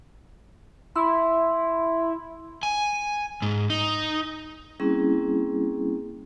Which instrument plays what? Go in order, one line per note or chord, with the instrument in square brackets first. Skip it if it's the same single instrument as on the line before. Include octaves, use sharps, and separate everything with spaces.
[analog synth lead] E4 [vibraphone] C6
[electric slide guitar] G#5
G#2
D#4
[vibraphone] G3 A#3 C4 C#4 E4 G#4